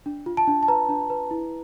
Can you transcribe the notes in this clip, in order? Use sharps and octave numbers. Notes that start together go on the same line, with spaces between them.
D4
F4
A5
D4
A5
B4 A#5
D4
B4
E4